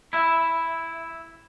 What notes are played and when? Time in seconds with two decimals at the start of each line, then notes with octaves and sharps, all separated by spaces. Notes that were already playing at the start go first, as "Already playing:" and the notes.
0.13 E4 E5